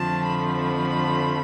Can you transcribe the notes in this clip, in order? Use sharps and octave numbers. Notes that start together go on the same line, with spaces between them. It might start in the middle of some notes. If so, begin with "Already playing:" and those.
Already playing: F2 D3 F3 A3 A5
B5